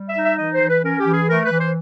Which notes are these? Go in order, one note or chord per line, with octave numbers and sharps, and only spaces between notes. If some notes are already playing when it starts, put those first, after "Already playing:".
Already playing: G3
E5
D#4
E5
E3 D#5
C5
E3
B4
C#4 A#4
G4
E3
G#4
A3 A#4
B4
E3
C5